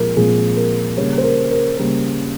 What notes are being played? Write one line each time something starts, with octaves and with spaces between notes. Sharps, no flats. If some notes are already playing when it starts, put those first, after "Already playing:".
Already playing: A#2 F3 G#3 C4 A#4
A#2 F3 G#3 C4 G#4
A#4
C#3 G3 A#3 C#5
C5
A#4
A#4
C#3 G3 A#3 A#4